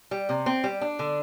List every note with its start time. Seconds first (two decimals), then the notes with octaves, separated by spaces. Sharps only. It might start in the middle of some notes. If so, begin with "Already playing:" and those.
0.11 G3
0.29 C3
0.46 C4
0.64 G3
0.81 D4
0.99 D3